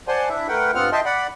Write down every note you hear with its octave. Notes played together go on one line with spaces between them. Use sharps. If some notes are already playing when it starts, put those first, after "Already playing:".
C5 D5 F#5 G#5 A5 C6
D4 E4 E5
A3 A#4 B4 F#5 G5
G2 B3 C4 F4 F#5 F6
D#5 E5 G5 A5 C6
D5 F#5 B5